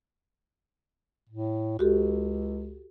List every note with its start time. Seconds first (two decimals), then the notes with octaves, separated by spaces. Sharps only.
1.29 A2
1.79 C#2 F#4 G4 A4